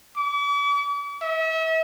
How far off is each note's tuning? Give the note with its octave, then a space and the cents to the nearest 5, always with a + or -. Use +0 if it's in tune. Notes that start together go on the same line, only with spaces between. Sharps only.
D6 -45
E5 -40